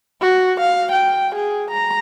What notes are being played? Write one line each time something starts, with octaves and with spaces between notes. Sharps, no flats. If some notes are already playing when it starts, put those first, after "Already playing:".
F#4
F5
G5
G#4
A#5